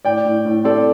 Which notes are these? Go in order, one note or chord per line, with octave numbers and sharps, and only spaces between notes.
A2 D5 G5
A2
A2
C4 A4 D5